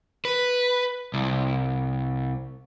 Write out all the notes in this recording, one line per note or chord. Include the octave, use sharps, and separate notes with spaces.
B4
C2